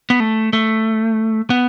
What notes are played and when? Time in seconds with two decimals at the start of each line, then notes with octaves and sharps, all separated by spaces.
0.10 B3
0.20 A3
0.53 A3
1.50 B3